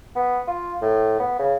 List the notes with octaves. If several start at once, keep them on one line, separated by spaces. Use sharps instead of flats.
B3
F4
A2
B3
C#3